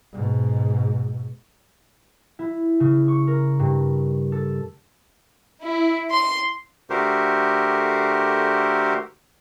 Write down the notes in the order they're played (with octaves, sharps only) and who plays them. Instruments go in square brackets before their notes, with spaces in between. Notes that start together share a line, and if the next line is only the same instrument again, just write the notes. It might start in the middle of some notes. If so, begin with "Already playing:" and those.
[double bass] G#2 B2
[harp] E4
C#3
C#6
A#4
G2
A4
[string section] E4
C6
[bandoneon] D3 A3 F#4 G4 A#4 C5